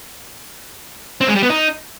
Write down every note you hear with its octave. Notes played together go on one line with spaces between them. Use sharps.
C4
G#3
G3
B3
D#4